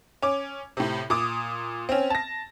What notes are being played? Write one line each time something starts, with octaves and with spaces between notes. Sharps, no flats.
C#4 D6
A2 C3
A#2 D6 D#6
C4 C#4
A5 A#6